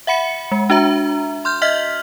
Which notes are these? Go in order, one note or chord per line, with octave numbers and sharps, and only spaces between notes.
E5 F#5 B5 C#7
G#3
D4 F#4 E5 A#5
C6 F6 G6
D#5 E5 F6 B6